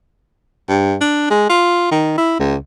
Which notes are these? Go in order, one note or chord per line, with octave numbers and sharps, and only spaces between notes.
G2
D4
G#3
F4
D#3
E4
C#2